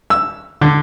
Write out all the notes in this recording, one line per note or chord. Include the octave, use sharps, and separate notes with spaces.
E6
D3